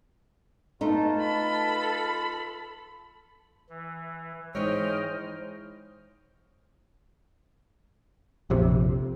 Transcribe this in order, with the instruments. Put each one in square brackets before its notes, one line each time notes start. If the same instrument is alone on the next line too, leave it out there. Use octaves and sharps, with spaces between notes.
[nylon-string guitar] A3 D#4 [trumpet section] F4 B4 A5
[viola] A4 B5
[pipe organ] E3
[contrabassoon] G#2 [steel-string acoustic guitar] E3 C#5 [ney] C5 [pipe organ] D#5 G5 F6
[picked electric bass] A#1 F2 C3